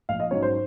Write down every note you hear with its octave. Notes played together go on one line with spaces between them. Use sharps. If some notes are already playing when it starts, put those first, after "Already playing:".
A#1 F5
D#5
G#2 F#3 C#4 C#5
C5